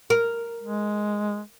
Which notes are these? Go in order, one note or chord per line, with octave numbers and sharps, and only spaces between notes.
A#4
G#3